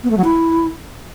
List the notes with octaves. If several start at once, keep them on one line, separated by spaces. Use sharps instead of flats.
B3
A3
F#3
E4